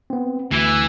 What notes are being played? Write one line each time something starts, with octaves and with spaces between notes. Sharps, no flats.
B3 C4
D2 E3